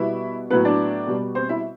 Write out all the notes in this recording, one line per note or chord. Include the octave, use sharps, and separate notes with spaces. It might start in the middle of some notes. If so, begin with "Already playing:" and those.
Already playing: B2 G3 B3 E4 E5
A2 F#3 B3 B4
D4 D5
B2 G3 B3
C4 C5
E4 E5